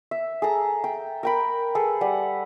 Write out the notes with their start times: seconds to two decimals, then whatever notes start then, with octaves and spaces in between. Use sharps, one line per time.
0.11 E5
0.42 G#4 A4 A#5
0.84 G5
1.23 A#4 G5 B5
1.75 G#4 A4 B4
2.01 G3 B4 F#5